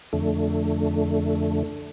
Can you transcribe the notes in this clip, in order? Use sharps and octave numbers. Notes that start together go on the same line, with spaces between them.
F2 D3 A3